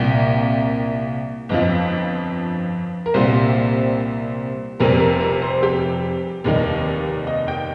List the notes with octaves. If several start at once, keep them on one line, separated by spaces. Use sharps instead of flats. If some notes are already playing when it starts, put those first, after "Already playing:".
Already playing: C2 A#2 A#3 G5
G1 F2 F3 D#5
A#4
C2 A#2 G3 C4 C5
F1 F2 C3 G3 C4 A#4
A#4
A#4
C5
G4
F1 D#2 D#3 G3 D#4
D#5
G5